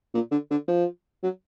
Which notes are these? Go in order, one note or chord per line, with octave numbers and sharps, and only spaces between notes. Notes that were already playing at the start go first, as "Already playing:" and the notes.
A#2
D3
D3
F3
F#3